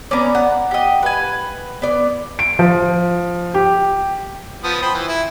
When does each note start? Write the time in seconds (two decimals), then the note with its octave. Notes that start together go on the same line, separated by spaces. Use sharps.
0.11 B3 C#4 D5 A#5
0.35 F#5
0.71 G4 D#5
1.03 B4 G#5
1.82 B3 D5
2.39 D7
2.59 F3
3.54 G4
4.64 F3 B3 D#6
4.82 C5 G5 B5
4.95 E3 G5
5.08 E4